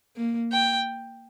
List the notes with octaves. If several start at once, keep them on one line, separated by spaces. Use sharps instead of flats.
A#3
G5